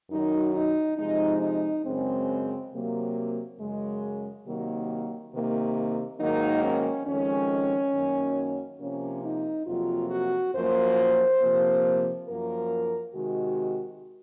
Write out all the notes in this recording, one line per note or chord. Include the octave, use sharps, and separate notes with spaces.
F#2 D#3 F#3 D#4
D#4
C3 F3 G#3 D#4
D#4
F#2 C#3 G#3 C4
C3 F#3 A#3
F#2 C#3 G#3
C3 D#3 F#3 A#3
C3 D#3 A#3
G#2 D#3 F#3 A#3 D#4
C#4
F2 D#3 G#3 C#4
F#2 D#3 F#3 A#3
C3 F3 A#3 C#4
D#4
F2 C3 F#3 A#3 F4
F#4
F#2 F3 A#3 C5
C3 F3 A#3
F#2 F3 A#3 A#4
C3 D#3 G#3 F#4